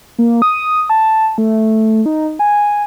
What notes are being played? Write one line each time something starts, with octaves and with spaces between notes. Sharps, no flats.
A#3
D#6
A5
A3
D#4
G#5